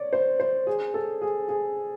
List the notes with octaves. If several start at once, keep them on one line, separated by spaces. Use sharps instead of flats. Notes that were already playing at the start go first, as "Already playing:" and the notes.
Already playing: C#5 D5
C5
C5
G#4
A4
G#4
G#4